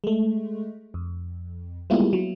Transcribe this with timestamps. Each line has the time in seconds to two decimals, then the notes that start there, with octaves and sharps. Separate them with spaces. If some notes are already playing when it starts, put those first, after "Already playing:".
0.04 G#3 A3
0.94 F2
1.90 G3 G#3 A#3 B3 E4 F4
2.13 F#3